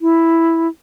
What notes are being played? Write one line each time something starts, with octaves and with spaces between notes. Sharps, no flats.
E4